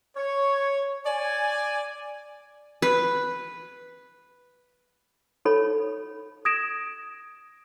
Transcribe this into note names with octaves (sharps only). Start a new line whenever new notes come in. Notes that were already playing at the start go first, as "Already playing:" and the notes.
C#5
D5 G#5
B4
D#4 A4 C#5 B5
D#6 G#6 A#6 D7 E7